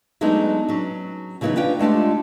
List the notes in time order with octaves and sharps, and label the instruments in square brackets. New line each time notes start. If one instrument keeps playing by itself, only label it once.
[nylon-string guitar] F#3 G#3 A3 B3 D4 D#4
F#3 C#4
C#3 E3 F#3 B3 D#4 B4
C#4 D4 F4 B4 G5
G#3 A3 D4 F4 G4